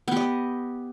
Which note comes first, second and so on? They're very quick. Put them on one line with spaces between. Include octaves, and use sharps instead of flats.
B3 G4 D#5